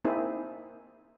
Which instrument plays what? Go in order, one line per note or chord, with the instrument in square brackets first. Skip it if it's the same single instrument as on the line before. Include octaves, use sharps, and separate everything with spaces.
[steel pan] A#3 C4 D#4 E4 G#4